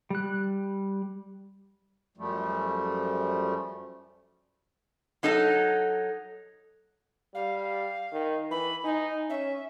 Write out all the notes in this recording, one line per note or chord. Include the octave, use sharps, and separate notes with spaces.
G3 F#6
F#2 F3 G3 A3
F#3 D#4 A4 D#5
G3 F5
D#3
E3 B5
D#4 G#5
C#4 E5